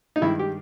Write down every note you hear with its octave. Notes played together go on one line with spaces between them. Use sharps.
D#4
G2 D#3 G#3 E4
G4